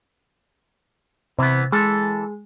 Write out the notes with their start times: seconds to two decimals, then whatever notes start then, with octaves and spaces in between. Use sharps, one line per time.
1.39 C3 E3 B3
1.72 E3 G#3 A4